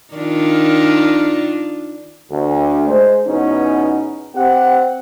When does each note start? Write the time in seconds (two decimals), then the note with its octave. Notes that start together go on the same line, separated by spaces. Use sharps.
0.14 D#3 D4 F4
2.30 D2
2.89 G#3 C5
3.27 E2 B2 B3 C#4 D#4
4.35 C4 G4 F#5